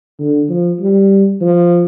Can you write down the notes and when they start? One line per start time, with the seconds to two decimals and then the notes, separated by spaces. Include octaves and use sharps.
0.20 D3
0.49 F3
0.81 G3
1.41 F3